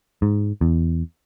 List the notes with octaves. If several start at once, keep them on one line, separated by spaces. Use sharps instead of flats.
G#2
E2